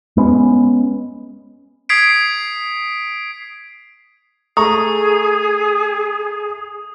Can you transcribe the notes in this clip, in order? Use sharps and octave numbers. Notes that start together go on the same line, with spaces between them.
G#3 B3 C#4
D#6 G#6 B6 C7 D7
A3 G#4 A#5 C#6 D#6